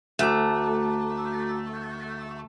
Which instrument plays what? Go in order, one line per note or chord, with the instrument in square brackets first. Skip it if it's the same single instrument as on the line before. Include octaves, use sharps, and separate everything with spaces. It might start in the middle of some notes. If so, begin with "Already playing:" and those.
[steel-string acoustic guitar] D2 [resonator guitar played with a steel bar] A3 [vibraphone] F#4 A#5 D6